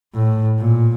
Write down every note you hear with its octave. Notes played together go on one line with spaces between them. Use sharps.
A2
A#2